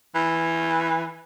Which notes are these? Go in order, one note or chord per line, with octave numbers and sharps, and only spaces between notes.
E3